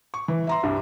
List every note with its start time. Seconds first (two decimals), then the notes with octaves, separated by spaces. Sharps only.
0.14 C#6
0.28 E3
0.47 E5 A#5 C6
0.63 C2 G2